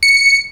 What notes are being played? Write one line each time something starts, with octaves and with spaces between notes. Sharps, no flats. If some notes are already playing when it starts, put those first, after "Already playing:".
C#7